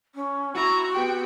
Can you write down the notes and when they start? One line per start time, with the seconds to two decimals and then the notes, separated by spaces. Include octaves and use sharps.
0.15 C#4
0.55 C4 E4 F#4 A#5 C#6
0.93 B3 G4 G5